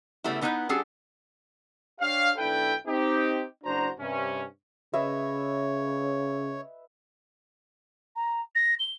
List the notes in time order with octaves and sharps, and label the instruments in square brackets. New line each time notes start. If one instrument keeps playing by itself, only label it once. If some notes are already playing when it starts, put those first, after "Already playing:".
[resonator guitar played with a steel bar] C#3 G3 A3 B3 E4
D3 B3 D#4 E4 B4
G3 C#4 D4 F#4 G#4 A4
[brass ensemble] D4 G4 C#5 F5
B1 D4 E4 A4 B4 G5
C4 D#4 G4
F#1 D4 F#4 C5 A#5
G2 C3 C#4
[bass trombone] C#3 [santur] B4 D#5 E5 [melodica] C#5
[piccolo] A#5
A#6
G7